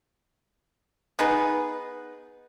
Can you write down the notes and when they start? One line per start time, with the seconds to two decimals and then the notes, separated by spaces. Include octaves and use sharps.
1.19 B3 D#4 G#4 B4